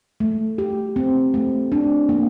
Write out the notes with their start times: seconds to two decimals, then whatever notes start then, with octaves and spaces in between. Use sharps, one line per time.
0.20 A3
0.58 G4
0.96 C4
1.34 A3
1.72 D4
2.09 A#3